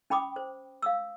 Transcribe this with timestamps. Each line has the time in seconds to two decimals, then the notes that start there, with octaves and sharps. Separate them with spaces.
0.10 C#4 G5 B5 D6 D#6
0.36 C5
0.82 F5 D#6 E6